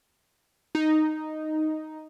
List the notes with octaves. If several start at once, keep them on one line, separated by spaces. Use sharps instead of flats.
D#4